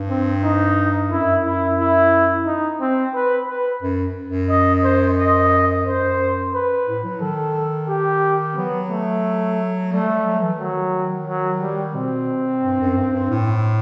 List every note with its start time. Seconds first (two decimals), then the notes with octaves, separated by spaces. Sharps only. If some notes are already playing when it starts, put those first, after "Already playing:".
Already playing: G2
0.09 C4
0.43 D#4
1.11 F#2 E4
1.45 E4
1.79 E4
2.46 D#4
2.81 C4
3.15 B4
3.48 B4
3.82 F#2
4.28 F#2
4.49 D#5
4.84 C5
5.17 D#5
5.85 F#2 C5
6.54 B4
6.86 A2
7.04 F#3
7.20 D#3 A4
7.88 G4
8.56 F#3 B3
8.90 A3
9.92 G3 A3
10.09 G3
10.26 F#3
10.42 E3
10.59 D#3 F#3
11.27 F#3
11.61 G3
11.95 B2 C4
12.62 G2
12.80 F#2
12.97 G2
13.13 G2
13.30 A2